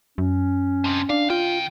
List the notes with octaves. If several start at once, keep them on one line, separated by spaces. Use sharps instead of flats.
F#2 C#4
C4 D4
D4 F5
D#3 F4 G5